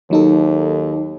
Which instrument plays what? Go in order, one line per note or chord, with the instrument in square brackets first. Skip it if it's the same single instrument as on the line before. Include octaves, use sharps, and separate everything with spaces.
[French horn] D#2 [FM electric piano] F#3 D#4 A4